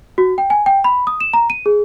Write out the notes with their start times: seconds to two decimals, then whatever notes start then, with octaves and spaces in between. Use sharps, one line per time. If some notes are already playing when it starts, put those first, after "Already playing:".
0.18 F#4
0.38 G5
0.50 G#5
0.66 G5
0.84 B5
1.07 D#6
1.20 E7
1.33 A#5
1.50 D#7
1.66 G#4